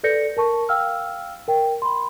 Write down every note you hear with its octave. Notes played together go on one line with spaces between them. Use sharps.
A4 B4 D5 G6 A#6 C#7
A#4 A5 C#6
F5 G5 E6 F6
A#4 G5
B5 C6